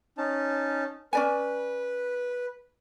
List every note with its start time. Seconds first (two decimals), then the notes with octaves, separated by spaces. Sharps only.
0.18 C#4 D#4 A5
1.13 C#4 B4 D5 G#5